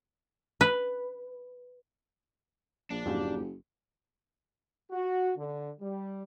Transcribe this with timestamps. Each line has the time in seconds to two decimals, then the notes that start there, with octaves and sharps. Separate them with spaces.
0.61 B4
2.90 A#1 D4
3.06 F#1 F2 G#2 A#3 D#4 G4
4.91 F#4
5.37 D3
5.80 G3